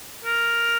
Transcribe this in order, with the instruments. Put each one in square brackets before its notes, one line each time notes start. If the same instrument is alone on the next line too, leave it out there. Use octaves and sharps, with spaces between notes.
[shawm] A#4